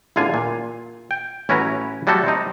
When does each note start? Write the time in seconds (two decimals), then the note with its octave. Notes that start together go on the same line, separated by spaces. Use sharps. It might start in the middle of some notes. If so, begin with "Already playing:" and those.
0.16 A1 E2 D3 F4 F5 G#5
0.34 A#2
1.11 G5
1.49 A1 C#4 E4 F#4 B4 A#5
2.07 F#3 G3 A3 F#4 A4
2.26 C4 D#4